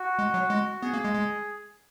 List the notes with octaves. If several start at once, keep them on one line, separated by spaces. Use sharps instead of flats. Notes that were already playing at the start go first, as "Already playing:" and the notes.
Already playing: F#4
G#3
F#3
G#3
B3 G#4
A#3
G#3
G#3